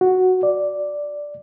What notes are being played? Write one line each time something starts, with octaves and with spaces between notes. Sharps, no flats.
F#4
D5